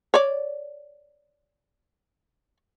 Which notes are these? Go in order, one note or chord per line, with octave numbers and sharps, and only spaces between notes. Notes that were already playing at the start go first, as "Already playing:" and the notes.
C#5 D5